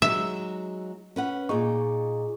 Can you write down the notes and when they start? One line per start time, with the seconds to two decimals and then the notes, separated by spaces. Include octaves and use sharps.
0.02 F#3 G#3 D#4 E5
1.16 C#4 B4 F#5
1.49 A#2 D#4 G#4 D#5 C#6